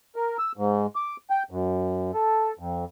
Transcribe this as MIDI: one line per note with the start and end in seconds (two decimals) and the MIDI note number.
0.16 0.37 70
0.38 0.52 88
0.57 0.87 44
0.96 1.16 86
1.30 1.43 79
1.51 2.11 42
2.14 2.53 69
2.59 2.85 41